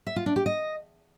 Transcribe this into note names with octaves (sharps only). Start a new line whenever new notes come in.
E5
F4
D4
G4
D#5